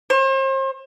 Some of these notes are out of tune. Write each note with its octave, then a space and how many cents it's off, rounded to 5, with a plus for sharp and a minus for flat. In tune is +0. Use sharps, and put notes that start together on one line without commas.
C5 +40